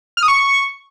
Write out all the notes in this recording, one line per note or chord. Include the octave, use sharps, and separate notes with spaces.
F6
D#6
C#6